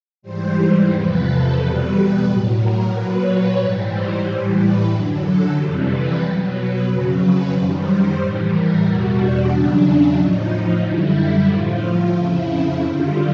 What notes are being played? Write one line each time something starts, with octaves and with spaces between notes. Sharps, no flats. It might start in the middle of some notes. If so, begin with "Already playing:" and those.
G#2 E3 G3 C5
C5
E2 C3 F3 B4
A4
E2 B2 G3 B4
A2 F#3 B4
A#4
A#2 F#3 B4
C#5
G#2 E3 G3
C5
A2 E3 G3
B4
F#2 D3 F#3
A4
F2 C3 E3 G3
B4
B2 F#3
B4
F2 C#3 F#3
B4
F#2 D#3 G3 C5
C5
A2 E3 G3
A#4
E2 B2 G3 F#4
D4
E2 C#3 F#3 D4
A2 F3 D#4
F#2 D3 G3 E4
A2 F3 F4
F2 C#3 F3 E4
F#2 D3 G3 F4